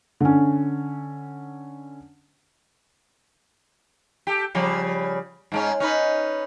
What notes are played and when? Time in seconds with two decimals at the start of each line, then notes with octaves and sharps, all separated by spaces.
0.20 D3 C#4
4.27 G4 A4
4.55 C#3 F3 G3
5.52 G#2 G#3 C#4
5.80 C#4 D#4 B4